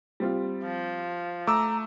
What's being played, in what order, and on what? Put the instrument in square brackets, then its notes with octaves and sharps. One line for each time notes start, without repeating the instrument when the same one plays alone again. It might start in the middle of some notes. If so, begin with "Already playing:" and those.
[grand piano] G3 C4 F4
[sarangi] F3
[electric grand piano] A3 E6 [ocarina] A#5 [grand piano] D6